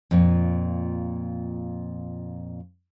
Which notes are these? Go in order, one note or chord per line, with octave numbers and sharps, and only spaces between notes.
F2 A#2